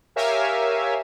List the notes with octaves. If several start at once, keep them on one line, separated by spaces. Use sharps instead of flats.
G4 A#4 C#5 E5 F5 G#5